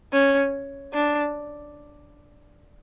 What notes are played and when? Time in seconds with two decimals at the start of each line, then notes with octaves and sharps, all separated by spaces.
0.13 C#4
0.93 D4